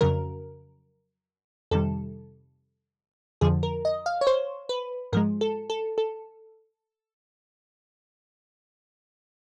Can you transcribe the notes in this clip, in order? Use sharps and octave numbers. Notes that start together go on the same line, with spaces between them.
F2 C#3 F#3 A#4
F2 C3 D#3 G3 A4
F2 D3 F3 G#4
A#4
D#5
F5
C#5
C5
B4
G#2 F3 G#3 A#4
A4
A4
A4